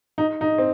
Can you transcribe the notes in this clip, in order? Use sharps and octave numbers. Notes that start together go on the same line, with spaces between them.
D#4
D#4
C4